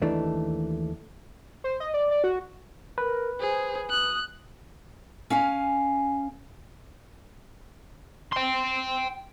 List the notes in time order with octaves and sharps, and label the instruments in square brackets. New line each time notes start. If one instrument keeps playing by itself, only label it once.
[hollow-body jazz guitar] D#2 D#3 E3 A3 D4
[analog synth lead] C5
D#5
D5
D5
F#4
[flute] A#4 [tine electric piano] B4
[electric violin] G#4 [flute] C5
[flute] D#6 [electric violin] F#6
[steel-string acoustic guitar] C#4 F5 G#5
[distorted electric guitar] G5 C6